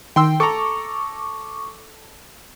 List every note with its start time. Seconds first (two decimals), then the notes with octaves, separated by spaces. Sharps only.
0.16 D#3 G5 C6 E6
0.40 A4 A#5 C#6 D6